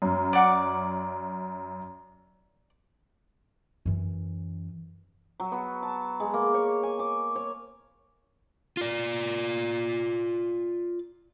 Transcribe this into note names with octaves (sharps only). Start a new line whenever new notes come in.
F#2
D5 F#5 D6
F#2 E3
F#3
B3
A5
G#3
A#3
C#5
G#5
D6
C#5
F4 D5